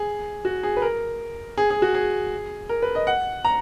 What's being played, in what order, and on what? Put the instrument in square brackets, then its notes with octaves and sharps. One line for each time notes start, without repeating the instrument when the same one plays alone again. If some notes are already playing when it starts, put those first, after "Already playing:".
Already playing: [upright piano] G#4
F#4
G#4
B4
A#4
G#4
G#4
F#4
G#4
A#4
B4
D#5
F#5
A#5